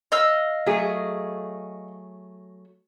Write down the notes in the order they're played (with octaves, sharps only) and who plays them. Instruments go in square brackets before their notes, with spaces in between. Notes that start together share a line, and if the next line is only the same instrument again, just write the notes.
[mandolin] D#5 F5 E6
[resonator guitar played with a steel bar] F#3 A3 G#4